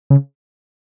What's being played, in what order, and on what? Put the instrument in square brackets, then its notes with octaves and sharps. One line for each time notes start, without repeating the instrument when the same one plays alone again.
[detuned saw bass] C#3